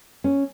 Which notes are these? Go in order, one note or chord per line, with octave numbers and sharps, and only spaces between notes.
C#4